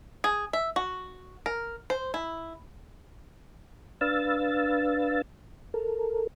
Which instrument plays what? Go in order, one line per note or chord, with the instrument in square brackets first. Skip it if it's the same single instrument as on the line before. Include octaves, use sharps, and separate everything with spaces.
[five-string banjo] G#4
E5
F#4
A#4
C5
E4
[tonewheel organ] D4 B4 F5 E6 A6
A4 A#4